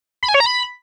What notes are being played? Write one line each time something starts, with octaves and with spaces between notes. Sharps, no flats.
B5
G#5
C#5
A#5
B5